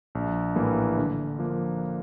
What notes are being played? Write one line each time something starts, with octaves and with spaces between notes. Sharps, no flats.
A#1
A2 E3 G3 A#3
D3
F3 A#3